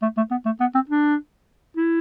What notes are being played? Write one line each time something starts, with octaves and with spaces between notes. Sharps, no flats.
A3
A3
B3
A3
B3
C4
D4
E4